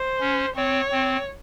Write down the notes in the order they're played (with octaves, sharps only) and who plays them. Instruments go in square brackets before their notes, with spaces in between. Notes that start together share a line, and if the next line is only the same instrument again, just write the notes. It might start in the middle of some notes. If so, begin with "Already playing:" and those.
Already playing: [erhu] C5
[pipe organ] C#4
[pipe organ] C4 [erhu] C#5
[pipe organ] C4